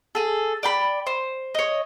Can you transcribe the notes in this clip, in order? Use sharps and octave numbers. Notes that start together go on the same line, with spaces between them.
G#4 A4
D5 G5 B5
C5
C#5 D#5